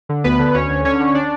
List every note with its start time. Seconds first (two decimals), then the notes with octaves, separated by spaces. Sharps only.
0.09 D3
0.24 D2 B3 B4
0.39 D3
0.54 D2 C#4 C#5
0.70 D2
0.85 D3 C#4 C#5
1.00 D3
1.15 D4 D5